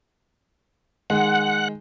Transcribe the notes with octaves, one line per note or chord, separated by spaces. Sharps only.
D#3 G#3 F#5